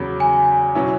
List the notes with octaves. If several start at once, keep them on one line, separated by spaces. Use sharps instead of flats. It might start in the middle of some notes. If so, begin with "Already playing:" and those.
Already playing: E2 C#3 F#3 B5
G#5
B2 F#3 C#4 E4